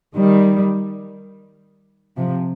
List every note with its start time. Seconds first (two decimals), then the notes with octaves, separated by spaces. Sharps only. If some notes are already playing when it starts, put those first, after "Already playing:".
0.15 D#3 G3
2.16 C3 F3